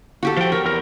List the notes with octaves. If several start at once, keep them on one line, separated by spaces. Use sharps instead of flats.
F#4 G4 A4
F3 G5
A#4 C#5
E2 A#4